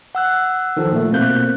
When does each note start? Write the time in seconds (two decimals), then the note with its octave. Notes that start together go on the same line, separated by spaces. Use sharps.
0.15 F#5 E6 F#6
0.77 D#3 F3 A4
0.92 A#2 A3
1.13 B2 A#3 C4 F#6 G6